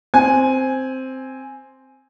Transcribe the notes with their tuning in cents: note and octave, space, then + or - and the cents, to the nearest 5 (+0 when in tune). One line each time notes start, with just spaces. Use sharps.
C4 +0 G#5 +0